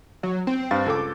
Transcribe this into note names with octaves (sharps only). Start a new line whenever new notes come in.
F#3
C4
G2 F5 A6
C#2 A4 D6